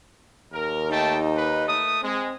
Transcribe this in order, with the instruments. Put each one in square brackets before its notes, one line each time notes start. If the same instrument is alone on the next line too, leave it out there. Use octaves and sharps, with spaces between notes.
[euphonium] D#2 [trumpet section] A#4
[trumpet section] A3 G5 A5 [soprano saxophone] D#4
[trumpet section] B4
A3 D#6
[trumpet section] G#3 [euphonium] C4